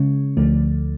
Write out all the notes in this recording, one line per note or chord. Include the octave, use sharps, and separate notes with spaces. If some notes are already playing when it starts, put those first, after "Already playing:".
Already playing: C#3 G#3 C#4
D2 D3 F3 A3